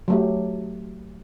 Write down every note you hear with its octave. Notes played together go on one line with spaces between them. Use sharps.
F#3 A3 G4